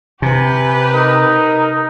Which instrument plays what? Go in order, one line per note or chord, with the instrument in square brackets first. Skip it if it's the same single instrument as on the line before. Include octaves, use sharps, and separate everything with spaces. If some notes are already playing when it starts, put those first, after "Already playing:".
[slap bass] C3 [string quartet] G4 B4 [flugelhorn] G#5
[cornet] D#4 [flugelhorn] A#4